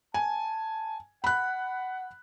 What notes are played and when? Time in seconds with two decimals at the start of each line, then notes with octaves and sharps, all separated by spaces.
0.14 G#5 A5
1.24 F#5 B5 F#6